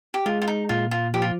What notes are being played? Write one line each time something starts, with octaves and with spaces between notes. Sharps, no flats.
G4
G#3 F4
F4
D#4
A#2 F4
F4
F3 G4
F4